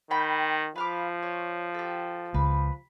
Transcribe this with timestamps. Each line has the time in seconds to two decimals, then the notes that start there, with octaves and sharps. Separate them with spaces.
0.11 D#3 G5 B5
0.76 F3 B4 F5 D6
1.23 C#5
1.74 G4 A4
2.34 C#2 B4